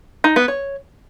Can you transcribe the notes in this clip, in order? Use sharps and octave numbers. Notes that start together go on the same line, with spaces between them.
D#4
B3
C#5